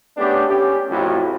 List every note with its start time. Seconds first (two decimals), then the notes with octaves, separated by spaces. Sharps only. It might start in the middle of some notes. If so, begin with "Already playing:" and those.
0.17 A3 B3 C#4 D4 G4
0.48 C#4 G4
0.89 A1 F2 A2 F#3 E4 F#4